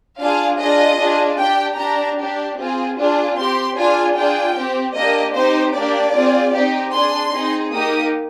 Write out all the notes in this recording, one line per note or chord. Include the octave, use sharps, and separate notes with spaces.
D4 F4 G#4 F5
D4 F4 G#4 D#5
D4 F4 G#4
D4 G4 G5
D4 G4 A#5
D4 G4
C4 F4 G#4
D4 F4 G#4
C4 G4 C6
D4 F4 G#4 G#5
D4 F4 G#4 G5
C4 G4
A#3 D4 G4 D#5
C4 D#4 G4 C5
A#3 D4 G4 D5
C4 F4 G#4
C4 D#4 G4
D4 G#4 C6
C4 D#4 G#4
A#3 D#4 G4 D#6